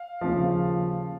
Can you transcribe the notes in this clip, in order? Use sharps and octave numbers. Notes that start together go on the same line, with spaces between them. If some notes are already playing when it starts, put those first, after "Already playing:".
Already playing: F5
D#2 C#3 F3